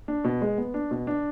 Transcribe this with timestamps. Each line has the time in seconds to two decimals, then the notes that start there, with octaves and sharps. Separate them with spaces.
0.08 D4
0.24 B2
0.41 G#3
0.58 B3
0.74 D4
0.91 B2
1.07 D4